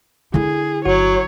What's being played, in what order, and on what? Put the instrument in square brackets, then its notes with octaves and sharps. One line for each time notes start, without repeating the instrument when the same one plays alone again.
[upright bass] D3 E4 [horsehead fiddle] G#4
[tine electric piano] G1 F#4 [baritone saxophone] F#3 [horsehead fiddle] C#5